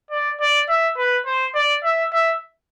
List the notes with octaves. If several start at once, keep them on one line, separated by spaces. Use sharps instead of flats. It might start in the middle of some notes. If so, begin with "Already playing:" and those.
D5
D5
E5
B4
C5
D5
E5
E5